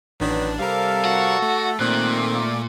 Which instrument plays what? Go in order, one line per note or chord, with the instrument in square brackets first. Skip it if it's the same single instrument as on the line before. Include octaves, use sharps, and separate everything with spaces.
[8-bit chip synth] A1 D4 [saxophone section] D#3 F#3 B4
[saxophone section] C3 F5 [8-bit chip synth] G3 A#4 [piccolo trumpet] A4
[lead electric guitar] F#4
[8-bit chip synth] A3
[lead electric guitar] A#2 [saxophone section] D#3 F3 C4 [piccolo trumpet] F#6
[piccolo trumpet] D5